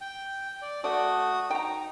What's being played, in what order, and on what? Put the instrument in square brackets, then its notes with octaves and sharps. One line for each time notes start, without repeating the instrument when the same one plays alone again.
[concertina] G5
D5
[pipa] A3 D5 [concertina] F#4 D#6
[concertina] D#4 [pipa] G5 A#5